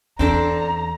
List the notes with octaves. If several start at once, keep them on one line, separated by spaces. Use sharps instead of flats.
E2 C4 D4 A4 A#5